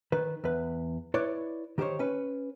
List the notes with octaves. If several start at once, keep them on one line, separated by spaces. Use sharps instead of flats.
D#3 B4
E2 B4
E4 B4 C#5 D5
D#3 G4 A4 C5 C#5
C#4 B4